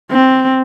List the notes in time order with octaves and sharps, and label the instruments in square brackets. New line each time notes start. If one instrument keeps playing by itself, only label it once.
[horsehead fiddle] C4